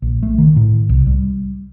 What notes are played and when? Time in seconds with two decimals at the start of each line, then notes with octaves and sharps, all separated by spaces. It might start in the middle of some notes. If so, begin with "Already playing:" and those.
0.02 A#1
0.23 A3
0.38 D#3
0.56 A2
0.89 C2
1.07 G3